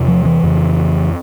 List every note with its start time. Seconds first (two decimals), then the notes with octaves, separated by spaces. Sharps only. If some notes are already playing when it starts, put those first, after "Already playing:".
Already playing: E2 C3
0.08 F3
0.26 E3
0.43 F2 C#3